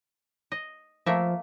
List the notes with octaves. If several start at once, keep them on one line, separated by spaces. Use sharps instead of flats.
D#5
F3 A3 A#3 E5